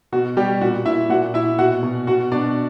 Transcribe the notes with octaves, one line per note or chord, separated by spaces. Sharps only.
B2 F#4
B2 G3 G4
A#2 F#4
A#2 E4 E5
A#2 F#4 F#5
A#2 E4 E5
B2 F#4 F#5
B2
B2 F#4 F#5
B2 D4 D5